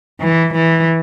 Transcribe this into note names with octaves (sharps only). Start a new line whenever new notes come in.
E3
E3